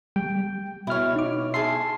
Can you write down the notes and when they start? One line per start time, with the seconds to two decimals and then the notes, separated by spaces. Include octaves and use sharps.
0.16 G3 G5
0.87 B2 E4 C#5 F6
1.16 D#4 D6
1.54 G#4 E5 A5 C6 C7